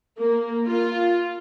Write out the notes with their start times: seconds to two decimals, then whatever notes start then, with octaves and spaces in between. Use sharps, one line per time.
0.20 A#3
0.67 F4